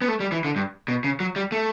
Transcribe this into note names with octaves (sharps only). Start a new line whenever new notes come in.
B3
A3
G3
E3
D3
G2
B2
C#3
F#3
G3
A3